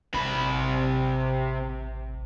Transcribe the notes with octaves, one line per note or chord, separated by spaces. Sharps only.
A1 C3 B5